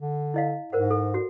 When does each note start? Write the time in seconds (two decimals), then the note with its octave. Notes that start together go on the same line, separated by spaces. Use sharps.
0.01 D3
0.34 E4 D#5 F5
0.72 G#2 A#4 C5 F#5
0.91 A4
1.14 F#4